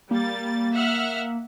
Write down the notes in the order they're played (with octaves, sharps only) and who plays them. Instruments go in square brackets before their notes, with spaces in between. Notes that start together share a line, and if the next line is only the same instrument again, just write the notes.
[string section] G3 A6 [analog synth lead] A#3
[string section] E5 F#5 F6